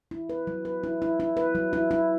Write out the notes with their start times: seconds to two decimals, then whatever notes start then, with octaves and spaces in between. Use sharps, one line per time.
0.11 E4
0.30 B4
0.47 F#3
0.65 B4
0.84 E4
1.02 E4
1.20 E4
1.37 B4
1.55 F#3
1.73 E4
1.91 E4